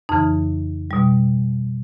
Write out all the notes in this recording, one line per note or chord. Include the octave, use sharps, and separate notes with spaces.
F2 C#3 E3 D#4
B2 G3